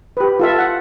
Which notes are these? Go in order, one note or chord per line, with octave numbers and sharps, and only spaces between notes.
G4 B4
F4 A4 E5
F#5